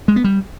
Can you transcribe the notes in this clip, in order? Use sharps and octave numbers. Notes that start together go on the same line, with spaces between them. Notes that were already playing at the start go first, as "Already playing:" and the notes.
G#3
B3
G3